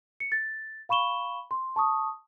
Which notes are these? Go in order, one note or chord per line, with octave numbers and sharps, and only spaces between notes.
C#7
A6
F5 B5 C#6 E7 G7
C6
A5 C#6 D#6